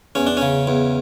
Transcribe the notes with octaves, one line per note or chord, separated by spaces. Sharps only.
E2 C#4
D4
C#3 C#4
E2